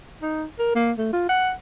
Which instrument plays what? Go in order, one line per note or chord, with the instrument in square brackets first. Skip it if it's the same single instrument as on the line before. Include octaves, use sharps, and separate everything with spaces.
[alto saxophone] D#4
A#4
A#3
A3
F4
F#5